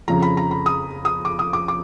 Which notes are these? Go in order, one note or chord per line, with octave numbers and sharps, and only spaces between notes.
F2 C#3 F3 A#5
B5
A#5
B5
D#6
D#6
D6
D#6
D6
D6